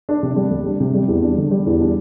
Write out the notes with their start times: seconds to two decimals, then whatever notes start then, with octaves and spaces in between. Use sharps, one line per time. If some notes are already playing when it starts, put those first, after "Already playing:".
0.09 D4
0.23 C3
0.36 G3
0.50 D2
0.66 D4
0.80 C3
0.94 G3
1.08 E2
1.22 D4
1.38 D3
1.51 G3
1.66 E2
1.80 D4